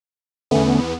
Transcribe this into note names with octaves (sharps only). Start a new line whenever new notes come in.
E2 D3 A3 B3 C#4